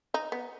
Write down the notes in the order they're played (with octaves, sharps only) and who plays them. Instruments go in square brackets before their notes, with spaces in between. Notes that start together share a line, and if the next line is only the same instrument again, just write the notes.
[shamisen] D#4
B3